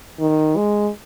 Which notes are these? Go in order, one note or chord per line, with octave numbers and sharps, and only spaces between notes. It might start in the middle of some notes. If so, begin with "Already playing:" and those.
D#3
G#3